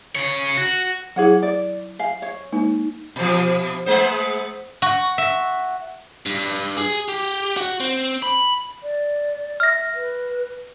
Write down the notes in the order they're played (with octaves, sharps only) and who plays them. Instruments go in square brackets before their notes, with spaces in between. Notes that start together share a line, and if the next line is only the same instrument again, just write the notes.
[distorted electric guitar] C#3 C#5
F#4
[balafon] F#3 E4 [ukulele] G#4 C#5 F#5
[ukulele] D5
[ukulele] F5 [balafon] G#5
[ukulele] C#5
[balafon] G#3 A#3 D#4
[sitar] B2 F3
G#3 B3 C5
[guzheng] F#4
E5
[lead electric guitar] G2
G#4
G4
F#4
C4
B5
[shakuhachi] D5
[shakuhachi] E5 [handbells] F6 A#6
[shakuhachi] B4